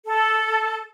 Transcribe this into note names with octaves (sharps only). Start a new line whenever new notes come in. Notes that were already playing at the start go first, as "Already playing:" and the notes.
A4